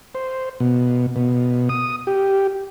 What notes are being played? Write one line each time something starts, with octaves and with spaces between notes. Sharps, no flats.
C5
B2
B2
D#6
G4